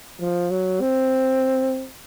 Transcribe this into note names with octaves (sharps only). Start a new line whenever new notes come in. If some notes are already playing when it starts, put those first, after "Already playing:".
F3
F#3
C4